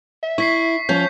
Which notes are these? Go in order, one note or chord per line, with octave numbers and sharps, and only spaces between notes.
E5
E4 C#6 B6 C7
F3 C#4 G6